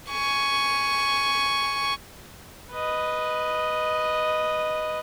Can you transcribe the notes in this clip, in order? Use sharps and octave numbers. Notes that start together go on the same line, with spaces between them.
G#5 C#6
B4 D#5